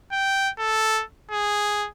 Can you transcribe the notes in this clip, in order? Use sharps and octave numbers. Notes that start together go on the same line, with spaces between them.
G5
A4
G#4